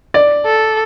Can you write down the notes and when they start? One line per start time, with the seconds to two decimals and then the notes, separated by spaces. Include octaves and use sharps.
0.14 D5
0.46 A4